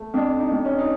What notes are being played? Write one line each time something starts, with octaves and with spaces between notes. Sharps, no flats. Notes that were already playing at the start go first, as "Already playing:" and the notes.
Already playing: A3
F2 D4
D4
D#4
F2
C#4
D#4